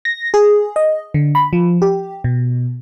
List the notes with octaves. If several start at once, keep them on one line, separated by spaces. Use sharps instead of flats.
A#6
G#4
D#5
D3
B5
F3
G4
B2